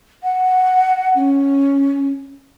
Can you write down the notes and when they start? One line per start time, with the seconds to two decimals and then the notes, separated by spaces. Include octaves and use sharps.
0.23 F#5
1.15 C#4